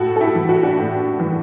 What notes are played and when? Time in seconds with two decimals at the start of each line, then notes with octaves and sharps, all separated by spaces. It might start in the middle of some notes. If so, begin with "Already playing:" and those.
Already playing: A2 F#4 A4
0.16 A4
0.21 E4 G4
0.35 E3
0.49 F#4
0.56 G4
0.63 D4 F#4
0.77 A2
1.20 E3